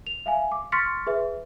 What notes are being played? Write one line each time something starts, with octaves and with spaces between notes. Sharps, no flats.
F7
E5 F5 G#5
D6
C6 C#6 F6 A6 B6 C#7
G#4 B4 E5